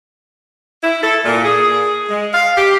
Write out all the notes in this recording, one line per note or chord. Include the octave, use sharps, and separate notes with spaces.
E4
A4
A#2
G#4
G#3
F5
G4